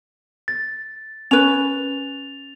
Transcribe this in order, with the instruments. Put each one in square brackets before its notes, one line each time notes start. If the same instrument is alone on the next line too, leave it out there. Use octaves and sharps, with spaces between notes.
[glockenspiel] A6
[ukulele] C#4 B4 [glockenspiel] F7